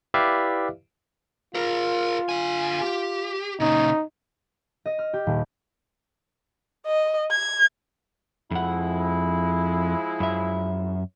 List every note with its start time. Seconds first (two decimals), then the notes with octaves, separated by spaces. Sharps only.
0.14 E4 G4 B4 D5 E5 F5
1.55 F4 G#4 A#4
2.29 D3 G#5
2.81 G4
3.60 A#2 C#3 D#4
4.86 D#5
4.99 F6
5.13 G4
5.26 D#1
6.87 D#5
7.31 G#6
8.51 F2 F3 G#3 E4 F#5
10.20 F#2 E5